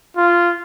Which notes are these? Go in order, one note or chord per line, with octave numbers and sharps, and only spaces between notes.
F4